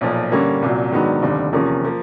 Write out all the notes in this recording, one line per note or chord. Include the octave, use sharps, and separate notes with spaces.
B1 A#2 F3
G2 D3 G3 A#3 C#4
C2 A#2 F#3
G#2 D#3 F#3 B3 D4
F1 D#2 D3 G3
E2 C3 F3 A#3 C#4
F3 A#3